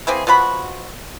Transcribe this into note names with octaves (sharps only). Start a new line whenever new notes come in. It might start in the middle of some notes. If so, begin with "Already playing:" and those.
E3 A#3 C4 G#4
B2 F3 F#4 B5